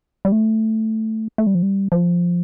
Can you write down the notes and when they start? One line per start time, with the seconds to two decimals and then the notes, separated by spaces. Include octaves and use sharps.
0.25 G3
0.32 A3
1.38 A3
1.47 G3
1.55 F3
1.62 G3
1.92 F3